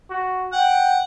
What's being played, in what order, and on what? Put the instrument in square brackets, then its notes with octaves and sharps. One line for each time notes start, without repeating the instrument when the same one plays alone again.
[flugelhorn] F#4
[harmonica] F#5 [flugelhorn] G5